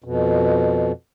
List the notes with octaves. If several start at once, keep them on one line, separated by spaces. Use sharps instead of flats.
F2 B2